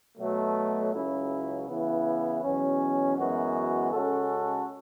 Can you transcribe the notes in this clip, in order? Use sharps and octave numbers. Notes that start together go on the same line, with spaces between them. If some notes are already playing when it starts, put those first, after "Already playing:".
B2 F#3 A3
C#2 C#3 F#3 C#4 E4
C#3 E3 B3 E4
E2 B2 F#3 C#4
F#2 E3 G#3 B3 F#4
C#3 G#3 C#4 F#4 A4